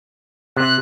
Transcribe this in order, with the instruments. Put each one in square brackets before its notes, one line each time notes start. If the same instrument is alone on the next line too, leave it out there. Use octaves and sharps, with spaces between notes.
[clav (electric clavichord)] C3 [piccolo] F#6